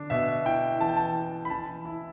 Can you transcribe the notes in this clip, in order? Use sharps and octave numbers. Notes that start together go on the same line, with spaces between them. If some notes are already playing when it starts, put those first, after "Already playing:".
Already playing: D3 D4
B2 E5
E4 G5
E3 A5
G5
A5
E4
B5
E3 A5
E4